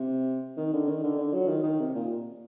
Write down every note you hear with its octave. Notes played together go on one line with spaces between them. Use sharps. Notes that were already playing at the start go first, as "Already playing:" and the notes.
Already playing: C3
D#3
D3
D#3
D3
D3
F#3
D#3
D#3
C3
A#2